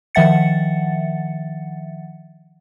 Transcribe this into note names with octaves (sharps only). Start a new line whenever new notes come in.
D#3 F3 E5 F#5 A6 C#7